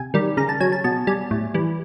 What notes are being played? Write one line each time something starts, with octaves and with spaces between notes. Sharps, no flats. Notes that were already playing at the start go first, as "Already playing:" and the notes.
Already playing: C3 G#5
D#3 G3
C#3 A#5
A5
F#3 G#5
A5
B2 A5
G3 G#5
A2
E3 G3